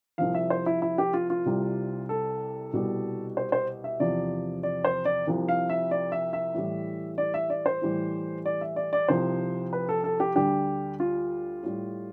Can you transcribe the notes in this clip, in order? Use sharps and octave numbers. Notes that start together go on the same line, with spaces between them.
C2 C3 F3 F5
E5
C5
E4
E4
G4
F4
F4
C2 C3 G3
A4
C2 B2 G3
C5
C5
E5
E2 C3 F3 D5
D5
C5
D5
C2 C3 F3
F5
E5
D5
E5
E5
A2 E3 G3
D5
E5
D5
C5
A2 E3 G3
D5
E5
D5
D5
C2 C3 F3 C5
B4
A4
A4
G4
D2 D3 G3 G4
F4
A2 G3